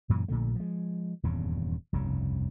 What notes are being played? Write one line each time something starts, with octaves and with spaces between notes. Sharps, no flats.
F#2 A#2 C#3 E3
A#1 A#2 D3 A3
F3 G#3
D#1 E2 G2 C#3
F1 C2 G2 C#3